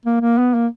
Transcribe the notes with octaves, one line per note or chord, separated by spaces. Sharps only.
A#3
A#3
B3
A#3